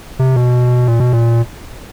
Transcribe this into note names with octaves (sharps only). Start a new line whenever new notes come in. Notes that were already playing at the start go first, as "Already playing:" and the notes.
C3
B2
A#2
B2
A#2